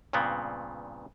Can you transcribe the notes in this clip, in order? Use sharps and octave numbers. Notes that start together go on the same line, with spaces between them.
G2 A#2 C#3 B3 C4